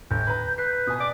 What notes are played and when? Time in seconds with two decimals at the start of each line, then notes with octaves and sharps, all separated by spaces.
0.11 G1 G6
0.27 B4 A#5
0.58 B4 C7
0.87 B2 G#5 D#6
1.00 D5 D6